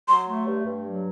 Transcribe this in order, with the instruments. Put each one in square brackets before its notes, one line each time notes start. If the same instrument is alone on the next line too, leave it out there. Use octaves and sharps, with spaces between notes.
[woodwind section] F#3 [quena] C6
[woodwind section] A3
G2
G2
F#3